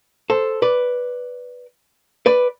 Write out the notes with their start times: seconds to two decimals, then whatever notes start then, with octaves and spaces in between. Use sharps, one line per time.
0.30 A4 C5
0.62 B4 D5
2.26 B4 D5